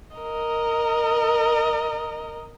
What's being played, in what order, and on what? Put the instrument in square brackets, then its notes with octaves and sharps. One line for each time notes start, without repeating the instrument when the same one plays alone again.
[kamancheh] A#4 D#5